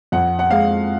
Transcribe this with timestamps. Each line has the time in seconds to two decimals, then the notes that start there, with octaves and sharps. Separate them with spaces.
0.12 F2 F#5
0.39 F#5
0.51 G#3 F5